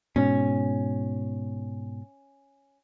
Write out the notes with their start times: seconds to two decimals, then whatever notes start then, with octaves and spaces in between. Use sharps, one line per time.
0.16 G#2 B2 C#4